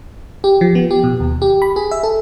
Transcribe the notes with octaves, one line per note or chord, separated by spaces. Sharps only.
G4
F3
B3
G4
B2
D#2
G4
B5
G#4
E5
A4